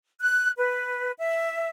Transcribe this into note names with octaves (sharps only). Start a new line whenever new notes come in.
F#6
B4
E5